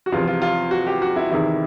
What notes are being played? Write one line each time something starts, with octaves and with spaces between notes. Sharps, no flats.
F#4
E2 C3 F3 F4
F4
F4
F#4
G4
F#4
E4
E2 C3 D#3 E4